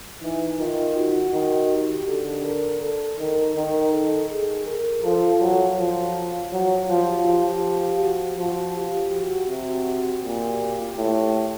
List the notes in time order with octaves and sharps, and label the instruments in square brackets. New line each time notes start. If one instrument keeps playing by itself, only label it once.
[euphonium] E3 [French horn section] D#4
[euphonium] D#3 [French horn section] F4
[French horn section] F#4
[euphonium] D#3
[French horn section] G4
[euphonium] D3 [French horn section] A4
[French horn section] A#4
A4
[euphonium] D#3 [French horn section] A#4
[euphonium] D#3
[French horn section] A4
G#4
A#4
[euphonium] F3 [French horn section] A4
[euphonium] F#3
F3
F#3
[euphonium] F3 [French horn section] G4
[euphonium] F3 [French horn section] G4
[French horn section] F#4
[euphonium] F3 [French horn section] F#4
[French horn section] G4
F#4
[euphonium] C3
[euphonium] A#2 [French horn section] G4
[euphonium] A2